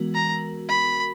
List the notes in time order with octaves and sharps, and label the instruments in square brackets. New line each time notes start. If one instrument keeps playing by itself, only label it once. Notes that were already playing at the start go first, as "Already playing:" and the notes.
Already playing: [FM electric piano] E3 G#3 B3 F#4 A#4
[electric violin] A#5
B5